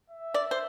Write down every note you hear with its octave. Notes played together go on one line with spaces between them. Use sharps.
E5
D5
C5